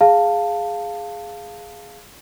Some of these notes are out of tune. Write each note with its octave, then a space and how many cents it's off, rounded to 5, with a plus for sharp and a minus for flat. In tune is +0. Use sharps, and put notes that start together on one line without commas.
G#4 +0 F5 +0 A5 +15